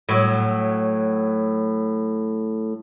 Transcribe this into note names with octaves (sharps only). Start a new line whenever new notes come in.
A2 F#3